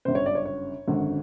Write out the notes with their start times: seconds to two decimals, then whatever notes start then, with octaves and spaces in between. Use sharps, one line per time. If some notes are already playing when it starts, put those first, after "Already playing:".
0.05 G1 F#2 C#3 C5
0.15 C#5
0.26 D5
0.35 C#5
0.45 C#5
0.87 G#1 F#2 D3